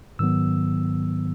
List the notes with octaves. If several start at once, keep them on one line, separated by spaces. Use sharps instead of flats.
G#2 D#3 F#3 B3 E6